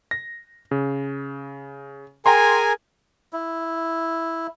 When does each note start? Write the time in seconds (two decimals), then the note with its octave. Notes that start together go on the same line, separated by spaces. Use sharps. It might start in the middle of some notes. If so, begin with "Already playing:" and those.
0.11 A#6
0.71 C#3
2.26 G#4 A#4 G5 G#5 A#5 C6
3.33 E4